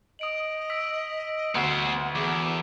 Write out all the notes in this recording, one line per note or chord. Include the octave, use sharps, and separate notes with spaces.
D#5 D#6 D7 F#7
E6 B6 D7
D2 B3 C5 F#5
E2 G#4 D6